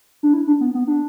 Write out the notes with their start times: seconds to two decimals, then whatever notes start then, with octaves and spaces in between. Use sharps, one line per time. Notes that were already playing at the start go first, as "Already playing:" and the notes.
0.23 D4
0.34 E4
0.47 D4
0.61 B3
0.74 B3
0.87 D4